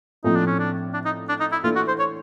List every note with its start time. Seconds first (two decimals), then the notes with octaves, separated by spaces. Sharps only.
0.24 A2 F3 A3 C4 D#4 F4
0.35 D4
0.47 C#4
0.59 D4
0.94 D4
1.05 D#4
1.29 D4
1.40 D#4
1.52 E4
1.64 E3 A3 D4 F4
1.76 F#4
1.88 C5
1.99 C#5